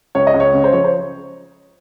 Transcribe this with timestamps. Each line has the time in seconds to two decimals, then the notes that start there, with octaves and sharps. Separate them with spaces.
0.15 C#2 C#5
0.27 D#5
0.34 C#2
0.40 C#5
0.54 C#3
0.64 C5
0.73 F3 C#5
0.84 C5